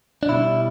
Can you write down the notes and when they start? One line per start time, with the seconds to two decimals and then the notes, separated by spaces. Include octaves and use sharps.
0.23 D4
0.28 B2 G3 E4